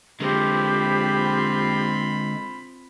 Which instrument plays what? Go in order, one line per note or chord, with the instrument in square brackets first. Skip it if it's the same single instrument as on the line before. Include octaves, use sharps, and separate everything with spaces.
[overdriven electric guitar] D3 G#3 [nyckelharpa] C4 F4 [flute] G4 [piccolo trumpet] B5